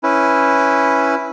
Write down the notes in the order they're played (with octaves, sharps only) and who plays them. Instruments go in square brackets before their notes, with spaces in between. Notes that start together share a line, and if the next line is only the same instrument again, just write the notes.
[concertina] C#4 E4 B4